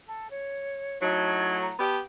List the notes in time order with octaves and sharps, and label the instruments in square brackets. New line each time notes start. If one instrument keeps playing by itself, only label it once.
[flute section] A4
C#5
[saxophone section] A2 F#3 [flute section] D#4 A4 G#6
[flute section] A#5
[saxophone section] B3 G4 [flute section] A5